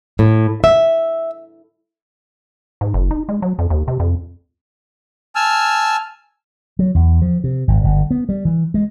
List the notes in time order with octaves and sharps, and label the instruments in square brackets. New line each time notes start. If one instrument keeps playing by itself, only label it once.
[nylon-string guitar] A2
E5
[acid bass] G#2
F#1
D#4
G#3
F#3
F2
D#2
C3
F2
[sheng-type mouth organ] G#5 A5 E6 F6
[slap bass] F#3
E2
F3
C3
G#1
G1
B3
G3
E3
G#3